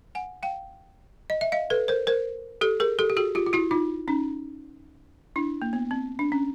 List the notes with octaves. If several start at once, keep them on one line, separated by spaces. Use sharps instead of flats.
F#5 G#5
F5 G5
D#5
E5
D#5 F5
A4 B4
A#4 C5
A#4 C5
G4 A4
G#4 A#4
G4 A4
G4
F#4 G#4
F4 G4
F4
E4 F#4
D#4 F4
C#4 D#4
D4 E4
A#3
B3
C4
D4
C#4